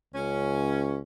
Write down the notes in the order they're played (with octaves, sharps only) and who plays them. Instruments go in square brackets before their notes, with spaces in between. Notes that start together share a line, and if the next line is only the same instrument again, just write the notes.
[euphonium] C#2 [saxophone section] C#4